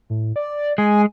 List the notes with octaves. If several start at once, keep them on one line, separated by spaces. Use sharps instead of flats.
A2
D5
G#3 G#5